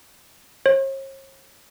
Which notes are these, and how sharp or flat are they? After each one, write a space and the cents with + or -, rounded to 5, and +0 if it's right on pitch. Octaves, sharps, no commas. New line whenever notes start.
C#5 -45